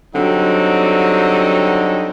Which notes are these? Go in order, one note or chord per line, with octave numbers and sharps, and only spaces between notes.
D3 F#3 G3 C4 D#4